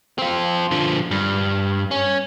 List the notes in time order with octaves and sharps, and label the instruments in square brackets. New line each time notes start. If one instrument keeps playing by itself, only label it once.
[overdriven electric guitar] C4 F4
D3 F3
G2
C#4